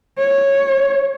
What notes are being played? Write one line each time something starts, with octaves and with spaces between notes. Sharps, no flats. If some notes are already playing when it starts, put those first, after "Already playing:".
C#5